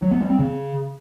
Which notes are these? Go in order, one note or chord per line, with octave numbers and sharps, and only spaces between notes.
F#3
B3
G3
C4
C#3